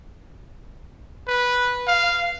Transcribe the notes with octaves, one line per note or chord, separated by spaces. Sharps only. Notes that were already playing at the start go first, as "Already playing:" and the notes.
B4
F5